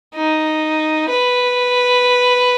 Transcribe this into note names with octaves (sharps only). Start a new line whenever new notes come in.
D#4
B4